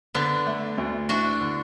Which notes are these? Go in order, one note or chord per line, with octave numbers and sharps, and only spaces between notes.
D3 B3 D4
A3
D2
D4 E4 F#4
D3